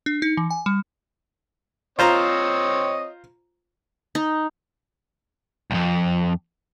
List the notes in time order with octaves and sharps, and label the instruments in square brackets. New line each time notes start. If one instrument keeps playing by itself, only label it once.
[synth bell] D4
D#4
E3
G#5
G3
[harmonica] C4 C#5 D#5 [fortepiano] F4 C5 A#5
[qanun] D#4
[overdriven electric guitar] C2 F2